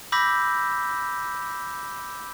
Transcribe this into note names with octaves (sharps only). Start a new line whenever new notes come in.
B5 D6 E6 G6 A#6 B6